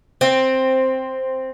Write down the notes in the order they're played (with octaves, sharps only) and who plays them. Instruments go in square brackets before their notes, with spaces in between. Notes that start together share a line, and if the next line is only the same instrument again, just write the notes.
[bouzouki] C4